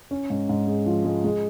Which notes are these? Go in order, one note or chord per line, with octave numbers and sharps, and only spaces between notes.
C#4
G#2
G#2
G#3
F3
G#3
G#3